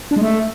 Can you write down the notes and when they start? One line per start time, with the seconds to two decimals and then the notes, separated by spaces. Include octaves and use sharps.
0.11 D4
0.16 G#3
0.22 A3